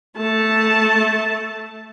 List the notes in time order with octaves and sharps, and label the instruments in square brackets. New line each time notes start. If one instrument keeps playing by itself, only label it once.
[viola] A3 A5